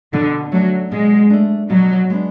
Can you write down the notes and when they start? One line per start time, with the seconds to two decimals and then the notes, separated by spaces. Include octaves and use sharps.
0.13 B2 D3
0.52 F#3 A3 D4
0.92 B2 G#3
1.30 A3 D4
1.70 B2 F#3
2.10 G#3 B3 D4